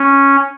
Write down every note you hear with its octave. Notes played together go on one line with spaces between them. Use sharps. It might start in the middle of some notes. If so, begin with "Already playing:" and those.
Already playing: C#4